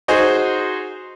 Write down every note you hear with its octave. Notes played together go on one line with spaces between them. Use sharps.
D#4 F#4 G#4 C5